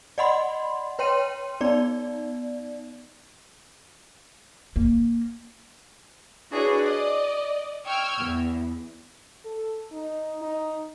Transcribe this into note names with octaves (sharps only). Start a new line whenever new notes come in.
D5 D#5 F#5 B5 C6
B4 C#5 G5 C6 D#7
B3 D#4 D5
A#3
D4 E4 F#4 G#4 B4 C#5
D5 D#5
G5 C#6 E6 F6 G#6
E2
A4
D#4
D#4